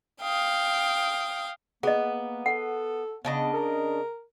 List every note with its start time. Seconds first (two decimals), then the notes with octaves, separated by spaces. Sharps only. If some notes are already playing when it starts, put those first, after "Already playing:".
0.21 F5 G5 D#6
1.83 A#3 B3 G#4 D#5
2.46 A4 F#5
3.25 C#3 B3 D4 D#5
3.54 A#4